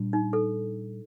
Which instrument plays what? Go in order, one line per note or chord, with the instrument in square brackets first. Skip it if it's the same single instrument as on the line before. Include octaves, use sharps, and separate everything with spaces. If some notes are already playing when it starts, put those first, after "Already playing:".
Already playing: [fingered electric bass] A#2 G3 D4
[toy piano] D#4
A4